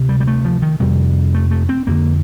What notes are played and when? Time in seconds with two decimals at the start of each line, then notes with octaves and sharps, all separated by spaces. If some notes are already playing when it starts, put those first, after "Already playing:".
Already playing: D2 C3
0.09 G3
0.20 G3
0.27 A3
0.45 F3
0.62 D#3
0.80 F2 C3 G3
1.34 A3
1.51 A3
1.69 C4
1.87 F2 D3 A#3